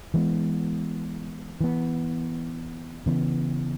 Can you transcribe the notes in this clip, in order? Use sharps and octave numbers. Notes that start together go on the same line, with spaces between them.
E3 G#3 B3
E3 B3
C#3 E3 B3